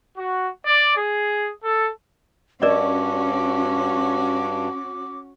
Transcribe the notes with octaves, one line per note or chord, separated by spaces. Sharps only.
F#4
D5
G#4
A4
G2 C#4 F#4 A#4 D5 D#5 D6